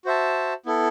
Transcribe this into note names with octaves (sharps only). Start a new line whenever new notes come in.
F#4 C5 E5 A5
B3 E4 A4